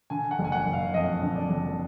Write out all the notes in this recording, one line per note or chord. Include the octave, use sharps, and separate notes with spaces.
D3 G#5
F#5
F#1
G#5
F#5
F#1
F5
F2 D#5
D3
D5
F#1